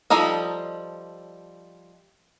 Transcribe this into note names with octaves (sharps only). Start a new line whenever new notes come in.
F3 G3 D#4 A4 D#5